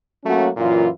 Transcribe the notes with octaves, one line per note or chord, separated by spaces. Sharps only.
F#3 A3 A#3 C#4 F#4
F#2 A#2 E3 F4